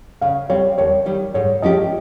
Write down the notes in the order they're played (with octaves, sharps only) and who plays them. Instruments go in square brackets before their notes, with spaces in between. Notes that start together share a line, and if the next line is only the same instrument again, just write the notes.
[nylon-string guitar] C#3 [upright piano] F5
[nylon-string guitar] G3 C4 [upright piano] C#5
[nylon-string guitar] D#2 [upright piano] C#5
[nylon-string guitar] D#3 G3
[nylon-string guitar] G#2 [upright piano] C#5
[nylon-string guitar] F3 G#3 C#4 G4 [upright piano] D#5